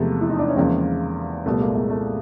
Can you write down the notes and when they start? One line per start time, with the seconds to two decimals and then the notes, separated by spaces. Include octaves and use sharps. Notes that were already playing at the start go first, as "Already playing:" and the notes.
Already playing: E2 C3 F3 G#3 A3 B3
0.21 E4
0.30 D#4
0.39 D4
0.48 C#4
0.57 E2 C#3 F3 G#3 A#3 C4
1.46 C2 A#2 G3 A3 B3
1.60 G#3 A#3
1.75 G#3 A#3
1.90 A3